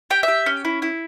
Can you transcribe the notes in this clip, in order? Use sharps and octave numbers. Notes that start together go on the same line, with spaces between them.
G4 G5
E5
G4
C#4
E4
E4